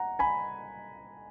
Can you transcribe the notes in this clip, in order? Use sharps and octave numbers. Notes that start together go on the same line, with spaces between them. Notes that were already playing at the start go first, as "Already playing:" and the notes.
Already playing: F#5 A#5
G#5 B5